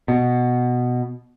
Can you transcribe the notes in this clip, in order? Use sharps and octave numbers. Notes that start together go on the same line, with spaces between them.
B2